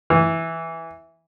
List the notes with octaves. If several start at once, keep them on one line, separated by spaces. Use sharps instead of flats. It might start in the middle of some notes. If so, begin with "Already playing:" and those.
E3